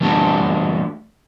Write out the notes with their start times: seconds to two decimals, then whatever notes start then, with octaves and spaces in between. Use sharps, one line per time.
0.01 E3 G3 A3 D4 F#4